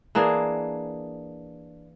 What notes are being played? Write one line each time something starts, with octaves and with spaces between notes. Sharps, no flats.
E3 A#3 D4 G#4